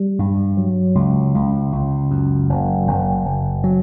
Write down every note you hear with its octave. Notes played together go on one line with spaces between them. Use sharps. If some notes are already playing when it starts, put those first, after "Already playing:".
Already playing: G3
G2
F#3
C#2
C#2
C#2
F#2
F#1
F#1
F#1
F#3